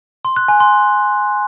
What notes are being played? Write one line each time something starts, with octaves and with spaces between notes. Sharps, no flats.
C6
F#6
G#5
C6